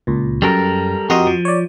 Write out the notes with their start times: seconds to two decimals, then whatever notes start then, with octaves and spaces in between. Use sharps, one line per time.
0.07 C#2 A#2
0.42 F#2 G3 A4 A#4
1.10 F2 F#4 G4 A#4 D#5 C6
1.27 F3
1.45 C#5 D5